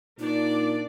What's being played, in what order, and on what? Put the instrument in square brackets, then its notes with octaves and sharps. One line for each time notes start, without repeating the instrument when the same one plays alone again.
[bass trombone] A#2 [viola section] D4 D5 [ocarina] D#4